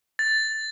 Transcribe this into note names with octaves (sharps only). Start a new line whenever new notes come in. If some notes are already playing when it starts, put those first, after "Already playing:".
A6